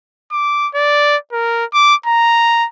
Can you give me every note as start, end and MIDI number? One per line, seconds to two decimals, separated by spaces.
0.32 0.68 86
0.75 1.17 74
1.33 1.65 70
1.73 1.95 86
2.07 2.66 82